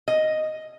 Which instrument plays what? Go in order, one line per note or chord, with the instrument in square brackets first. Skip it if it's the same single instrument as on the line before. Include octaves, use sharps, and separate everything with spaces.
[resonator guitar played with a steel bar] D#5